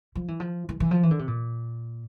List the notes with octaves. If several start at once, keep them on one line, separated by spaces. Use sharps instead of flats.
F3
E3
F3
E3
E3
F3
E3
D3
C3
A#2